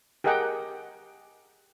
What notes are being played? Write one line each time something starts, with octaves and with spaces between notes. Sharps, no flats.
G4 G#4 A#4 D#5 F#5 G5